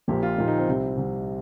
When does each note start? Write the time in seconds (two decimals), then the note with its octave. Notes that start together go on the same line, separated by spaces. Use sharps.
0.08 A#1 A#2 F3 A#3 G4
0.23 F4
0.38 A#1 A#2 F3 A#3 D#4
0.48 D#4
0.58 C4
0.68 C2 C3 G3
0.97 C2 C3 G3